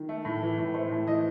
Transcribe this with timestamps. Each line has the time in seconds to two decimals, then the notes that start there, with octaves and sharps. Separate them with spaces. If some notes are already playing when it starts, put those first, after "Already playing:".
Already playing: D#3
0.09 A3
0.25 A2
0.42 E3
0.58 A2
0.74 A3 C5
0.91 A2
1.07 E3 D#5